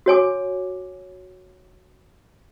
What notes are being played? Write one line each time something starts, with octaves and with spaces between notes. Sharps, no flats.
F#4 C#5 G#5 D6